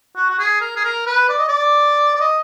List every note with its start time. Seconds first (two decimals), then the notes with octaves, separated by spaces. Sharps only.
0.16 F#4
0.30 F#4
0.39 G#4
0.61 A#4
0.76 G#4
0.84 A#4
1.07 B4
1.29 D5
1.39 D#5
1.48 D5
2.15 D5
2.20 D#5